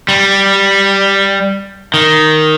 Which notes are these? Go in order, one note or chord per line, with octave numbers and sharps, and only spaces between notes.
G3
D#3